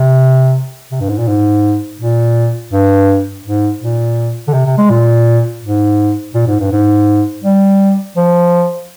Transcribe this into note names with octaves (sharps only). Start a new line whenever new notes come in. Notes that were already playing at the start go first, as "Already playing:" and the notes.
Already playing: C3
C3
G2
G#2
A#2
G#2
A#2
G2
G#2
A#2
D3
C3
C3
G#3
A#2
G#2
A#2
G#2
G2
G#2
G3
F3